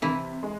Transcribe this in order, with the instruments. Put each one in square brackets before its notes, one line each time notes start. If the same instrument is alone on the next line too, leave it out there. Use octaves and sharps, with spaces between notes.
[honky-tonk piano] C3 [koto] E3 E4
[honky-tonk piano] G#3